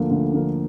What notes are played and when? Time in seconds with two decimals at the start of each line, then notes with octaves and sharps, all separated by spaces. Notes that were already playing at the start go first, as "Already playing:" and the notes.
Already playing: D2 D3 F3 A#3
0.11 D2
0.34 D3 F3 A#3